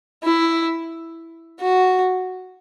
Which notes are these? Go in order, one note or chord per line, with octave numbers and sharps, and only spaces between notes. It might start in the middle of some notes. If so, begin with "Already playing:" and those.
E4
F#4